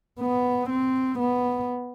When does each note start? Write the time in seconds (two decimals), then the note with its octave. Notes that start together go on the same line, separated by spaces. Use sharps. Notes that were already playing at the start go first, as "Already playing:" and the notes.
0.20 B3
0.70 C4
1.19 B3